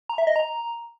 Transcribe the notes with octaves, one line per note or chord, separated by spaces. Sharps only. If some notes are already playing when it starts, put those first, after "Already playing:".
A#5
E5
D#5
A#5